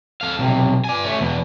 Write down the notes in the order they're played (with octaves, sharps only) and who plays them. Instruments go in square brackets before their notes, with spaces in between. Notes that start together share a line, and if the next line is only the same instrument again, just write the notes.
[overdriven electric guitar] A4 F5
B1 C3
D5 G#5
A3 C#4
E2 B2